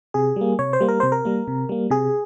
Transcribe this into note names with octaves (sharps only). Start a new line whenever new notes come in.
C3 G#4
G3 A#3
C3 C#5
C5
G3 A#3
A#4
C3 C5
A#4
G3 A#3
C3
G3 A#3
C3 G#4